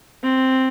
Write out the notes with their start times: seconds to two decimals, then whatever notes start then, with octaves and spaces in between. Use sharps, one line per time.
0.23 C4